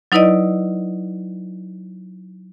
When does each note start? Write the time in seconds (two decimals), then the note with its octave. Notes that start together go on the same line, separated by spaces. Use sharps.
0.12 F#3 D#4 E4 B4 D5 D#5